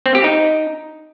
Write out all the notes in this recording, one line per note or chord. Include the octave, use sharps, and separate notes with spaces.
C4
G4
D#4